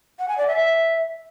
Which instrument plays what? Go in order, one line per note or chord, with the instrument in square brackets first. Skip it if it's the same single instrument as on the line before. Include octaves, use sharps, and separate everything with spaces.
[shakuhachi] F#5
G#5
D5
E5